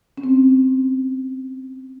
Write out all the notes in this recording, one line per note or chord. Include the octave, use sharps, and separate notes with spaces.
C#4
C4